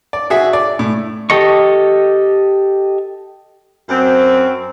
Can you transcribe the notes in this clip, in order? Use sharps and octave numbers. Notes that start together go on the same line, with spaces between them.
D5
F#4 G#4 E5
D5
A2
G4 A4 D#5 C#6
F#2 C4